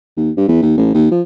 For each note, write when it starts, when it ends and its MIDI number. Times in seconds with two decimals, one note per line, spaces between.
0.17 0.31 39
0.37 0.46 43
0.48 0.58 40
0.62 0.74 39
0.77 0.90 33
0.94 1.09 39
1.11 1.21 53